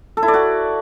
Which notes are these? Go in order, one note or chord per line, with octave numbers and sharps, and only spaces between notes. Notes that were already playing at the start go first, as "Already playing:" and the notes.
A4
E4
D5
F#4